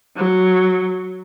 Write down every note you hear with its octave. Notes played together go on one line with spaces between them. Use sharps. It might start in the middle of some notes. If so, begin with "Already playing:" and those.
F#3